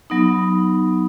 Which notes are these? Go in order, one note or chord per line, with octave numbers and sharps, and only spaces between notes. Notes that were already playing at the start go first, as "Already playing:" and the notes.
F#3 B3 D#4